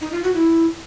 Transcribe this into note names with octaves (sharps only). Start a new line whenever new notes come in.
D#4
F4
F#4
E4